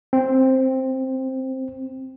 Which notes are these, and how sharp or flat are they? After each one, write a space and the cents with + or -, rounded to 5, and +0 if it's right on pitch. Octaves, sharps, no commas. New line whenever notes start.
C4 +5